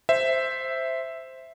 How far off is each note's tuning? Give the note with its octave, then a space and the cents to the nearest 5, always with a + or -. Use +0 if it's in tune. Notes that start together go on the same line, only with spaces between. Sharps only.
C5 +0 E5 +0